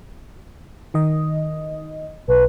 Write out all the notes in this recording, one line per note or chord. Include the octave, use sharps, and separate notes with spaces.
D#3 D#5
B1 B4